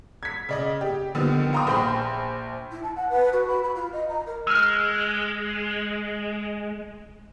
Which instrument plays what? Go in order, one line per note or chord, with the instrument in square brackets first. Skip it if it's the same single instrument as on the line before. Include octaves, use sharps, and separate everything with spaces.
[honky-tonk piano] G#6 B6
C#3 D5 D#5
G4
D3 D#3 F3 G3 B3
F5 G5 A#5 C6 C#6 D#6
A#1 C5 G5 B5 C6
[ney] E4
A5
F#5
B4
F#4
B5
B5
F4
D#5
A#5
A#4
[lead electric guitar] G#3 [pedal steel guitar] E6 F6